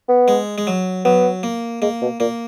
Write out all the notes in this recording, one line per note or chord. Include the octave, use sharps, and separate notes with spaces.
B3
G#3
G#3
F#3
F#3 B3
A#3
G#3 A#3
B2
A#2 A#3